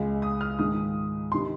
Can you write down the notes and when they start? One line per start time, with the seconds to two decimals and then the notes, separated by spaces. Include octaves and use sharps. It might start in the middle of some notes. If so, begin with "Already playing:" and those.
Already playing: C#2 C#3 G#3
0.22 D#6
0.41 F6
0.59 G#2 D#3 G#3 D#6
1.32 C3 D#3 C6